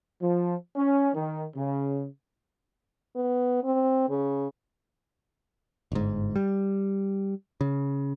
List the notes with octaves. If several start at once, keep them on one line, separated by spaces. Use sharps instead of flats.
F3
C#4
D#3
C#3
B3
C4
C#3
G1 G#2
G3
C#3